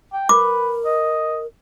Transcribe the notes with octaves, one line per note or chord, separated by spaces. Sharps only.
G5
A#4 B4 D6
D#5